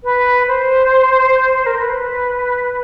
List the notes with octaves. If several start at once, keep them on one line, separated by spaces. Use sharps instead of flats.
B4
C5
A#4
B4